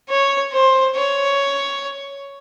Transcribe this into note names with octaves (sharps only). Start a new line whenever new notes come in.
C#5
C5
C#5